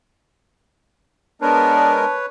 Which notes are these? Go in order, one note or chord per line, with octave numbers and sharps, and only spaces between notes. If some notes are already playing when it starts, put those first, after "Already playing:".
G#3 B3 D4 A#4 B4 C#5 A5